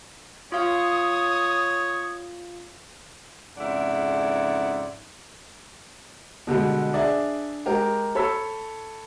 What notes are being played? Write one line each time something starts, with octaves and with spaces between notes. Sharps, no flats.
F4 C#5 F5 D#6
F2 G#2 C#3 E4 D5 F#5
B2 D3 G3 G#3
D4 G#4 D5 E5
G#3 G4 A#4
A4 C#5 B5 E6 B6